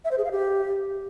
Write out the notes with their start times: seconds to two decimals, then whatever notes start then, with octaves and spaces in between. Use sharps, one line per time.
0.05 E5
0.11 C5
0.18 G#4
0.25 F5
0.32 G4